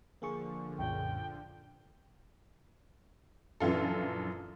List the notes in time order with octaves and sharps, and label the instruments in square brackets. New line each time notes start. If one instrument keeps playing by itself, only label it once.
[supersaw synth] D3 F3 [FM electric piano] A#3 G#4 C#6
[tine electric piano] C2 F#2 A#2 [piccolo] G5
[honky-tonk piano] A#1 F#2 E3 F4 A4